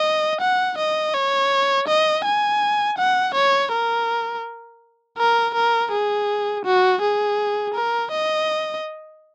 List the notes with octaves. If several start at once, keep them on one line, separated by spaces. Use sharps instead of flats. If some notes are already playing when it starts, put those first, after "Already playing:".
Already playing: D#5
F#5
D#5
C#5
D#5
G#5
F#5
C#5
A#4
A#4
A#4
G#4
F#4
G#4
A#4
D#5